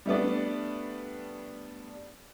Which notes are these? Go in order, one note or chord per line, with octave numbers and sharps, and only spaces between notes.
G3 A3 B3 D4